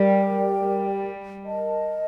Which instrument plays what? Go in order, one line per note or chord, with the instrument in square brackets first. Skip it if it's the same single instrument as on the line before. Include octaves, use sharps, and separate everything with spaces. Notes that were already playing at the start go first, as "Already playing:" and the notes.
Already playing: [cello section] G3 [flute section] G4 A#4 D5 G5
[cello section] G3
[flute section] A#4 D#5 A5